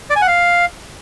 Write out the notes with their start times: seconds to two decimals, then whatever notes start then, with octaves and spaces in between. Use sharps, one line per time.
0.10 D5
0.16 G#5
0.22 F#5
0.28 F5